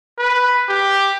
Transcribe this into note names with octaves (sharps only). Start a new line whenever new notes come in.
B4
G4